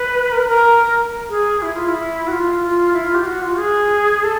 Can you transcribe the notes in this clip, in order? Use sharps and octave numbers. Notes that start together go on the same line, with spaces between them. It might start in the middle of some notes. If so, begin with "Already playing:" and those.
Already playing: B4
A#4
A#4
G#4
E4
F4
E4
F#4
F4
F4
E4
F4
G4
F#4
F4
G#4
A4